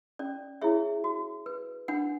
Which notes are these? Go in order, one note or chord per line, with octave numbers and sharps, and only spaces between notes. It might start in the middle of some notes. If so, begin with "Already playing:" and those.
C#4 D5
E4 G#4 C#5 E5
F#4
B4
D4 F#5